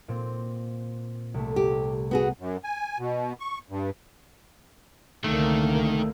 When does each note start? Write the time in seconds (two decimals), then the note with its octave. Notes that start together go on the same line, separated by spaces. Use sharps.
0.08 A#2 C4
1.34 C2 A3
1.56 G4
2.11 B3 F#4 G#4
2.39 F#2
2.64 G#5
2.99 B2
3.40 C#6
3.70 G2
5.24 C2 D3 D#3 A3 A#3